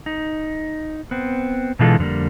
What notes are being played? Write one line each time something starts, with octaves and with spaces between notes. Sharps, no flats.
D#4
B3 C4
B2 D3 E3 G#3 F4 A4
F2 D3 G3 A#3